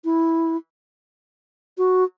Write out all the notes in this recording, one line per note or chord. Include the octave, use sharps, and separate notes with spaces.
E4
F#4